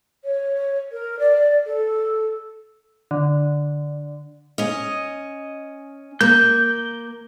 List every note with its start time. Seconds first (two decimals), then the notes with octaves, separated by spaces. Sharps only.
0.24 C#5
0.92 A#4
1.19 D5
1.66 A4
3.11 D3
4.58 C#4 D#5
6.21 A#3 G6